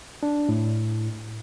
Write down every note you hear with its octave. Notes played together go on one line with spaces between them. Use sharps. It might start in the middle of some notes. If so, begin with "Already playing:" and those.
D4
A2